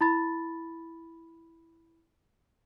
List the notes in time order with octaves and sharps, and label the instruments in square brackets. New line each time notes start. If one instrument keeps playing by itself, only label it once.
[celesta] E4 B5 A6